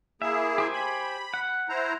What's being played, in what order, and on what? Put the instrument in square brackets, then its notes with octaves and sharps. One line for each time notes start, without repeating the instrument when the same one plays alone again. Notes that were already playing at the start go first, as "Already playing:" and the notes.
[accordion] A#3 E4 G#4 [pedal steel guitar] E5
[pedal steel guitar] G4 C5 G#5
[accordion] B5
[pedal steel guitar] F#5
[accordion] E4 C5 A#5